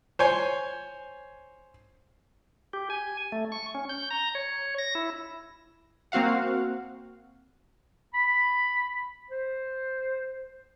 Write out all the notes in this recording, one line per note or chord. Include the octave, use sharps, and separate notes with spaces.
C5 C#5 G#5
G4
G#5
A3
C#6
C#4
G6
A#5
C#5
A#6
E4
A#3 C4 F#4 F5 F#5
B5
C5